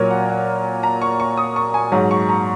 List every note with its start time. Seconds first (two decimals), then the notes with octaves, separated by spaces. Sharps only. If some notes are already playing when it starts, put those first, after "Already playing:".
Already playing: A#2 F#3 A#4 C#5
0.11 F#5
0.29 F#5
0.83 A#5
1.02 C#6
1.20 C#6
1.37 D#6
1.56 C#6
1.74 G#5
1.92 G#2 F#3 A#5
2.11 C#6
2.29 A#5